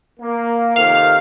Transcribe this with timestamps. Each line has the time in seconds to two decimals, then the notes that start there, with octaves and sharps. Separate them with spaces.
0.20 A#3
0.76 F2 C3 D#3 F5